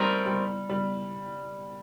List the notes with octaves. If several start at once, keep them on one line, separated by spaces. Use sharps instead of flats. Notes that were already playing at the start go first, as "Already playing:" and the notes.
Already playing: G3 A3 C4 D#4 A#4
G3
G3